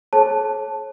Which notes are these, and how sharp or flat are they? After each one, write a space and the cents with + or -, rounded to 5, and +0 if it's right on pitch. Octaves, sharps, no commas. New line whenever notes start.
G#4 +45 C#5 -35 A5 +0